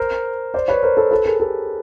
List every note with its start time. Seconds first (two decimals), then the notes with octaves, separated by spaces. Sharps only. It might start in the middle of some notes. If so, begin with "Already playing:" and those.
Already playing: A#4 C5
0.54 C5 D5
0.68 B4 C#5
0.83 A#4 C5
0.97 A4 B4
1.11 A4 B4
1.25 G#4 A#4
1.40 G4 A4